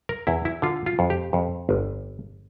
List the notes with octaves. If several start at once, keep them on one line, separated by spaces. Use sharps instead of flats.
A#4
E2 E4
E4
D3 F4
F4
F2
G4
F2
G1